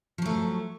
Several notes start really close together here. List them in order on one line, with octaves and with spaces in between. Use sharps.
F3 F#3 A3